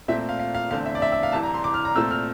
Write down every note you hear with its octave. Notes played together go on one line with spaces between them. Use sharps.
A#2 A3 C4 E5
F5
F5
F5
E2 D3 A3 C4 F5
E5
D5
E5
E5
F5
C2 C3 E3 A5
A#5
C6
D6
F6
A#5
A#2 A3 C4 E6
F6